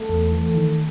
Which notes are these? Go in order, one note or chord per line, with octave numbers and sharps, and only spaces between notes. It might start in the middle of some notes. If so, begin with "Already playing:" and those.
Already playing: A3 A4
E2
E3
D#3